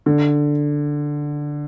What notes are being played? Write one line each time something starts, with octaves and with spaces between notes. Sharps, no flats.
D3